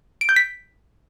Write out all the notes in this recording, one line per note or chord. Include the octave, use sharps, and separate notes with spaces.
D7
G6
B6